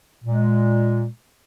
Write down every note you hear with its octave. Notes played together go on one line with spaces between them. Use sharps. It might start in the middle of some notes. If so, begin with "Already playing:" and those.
A#2 G#3